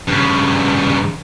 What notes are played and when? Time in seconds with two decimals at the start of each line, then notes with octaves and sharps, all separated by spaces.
0.08 G2 C#3